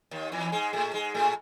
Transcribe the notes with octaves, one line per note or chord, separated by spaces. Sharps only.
D#2 D#3
E2 E3
G#2 G#3
A2 A3
G#2 G#3
A2 A3